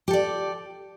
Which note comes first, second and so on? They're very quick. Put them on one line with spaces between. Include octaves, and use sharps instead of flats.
G4 A4 D5